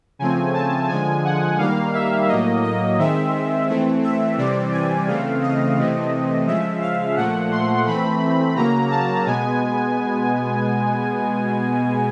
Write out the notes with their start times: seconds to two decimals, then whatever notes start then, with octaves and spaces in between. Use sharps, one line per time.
0.19 C#3 F3 A3 C4 G#5
0.54 A5
0.89 D3 F3 G#3 G#5
1.25 F#5
1.58 D#3 G3 A#3 F5
1.94 E5
2.28 A2 F#3 A#3 D#5
2.63 D#5
2.98 D#3 G#3 C4 E5
3.68 E3 A3 C4
4.03 E5
4.37 C3 E3 G3 C4 D5
4.72 G#5
5.07 C#3 E3 A3 C4 F5
5.42 D#5
5.78 C3 E3 A3 C4
6.46 C#3 F3 G#3 E5
6.81 F5
7.16 A#2 F3 A3 F#5
7.52 C6
7.86 E3 A3 C4 B5
8.56 C#3 F#3 A#3 A#5
8.90 A5
9.26 B2 G#3 B3 G#5